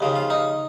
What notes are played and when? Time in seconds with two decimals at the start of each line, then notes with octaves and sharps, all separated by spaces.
0.01 D#2 C#3 F3
0.16 F4
0.30 D#4